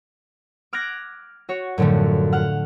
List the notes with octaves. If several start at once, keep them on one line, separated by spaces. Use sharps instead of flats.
D6 F6 F#6 G#6 A#6 D7
F#4 C#5
F#2 A2 D3 F3 A3
F#5 F6